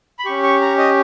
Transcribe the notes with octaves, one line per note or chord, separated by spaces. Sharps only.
B5
C#4 G4 C#6
C#6
A#5
D#5